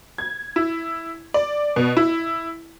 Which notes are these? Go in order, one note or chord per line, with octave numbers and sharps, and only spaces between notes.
G#6
E4
D5
B2
E4